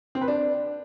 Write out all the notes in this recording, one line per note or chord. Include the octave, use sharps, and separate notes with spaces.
C4
B4
D4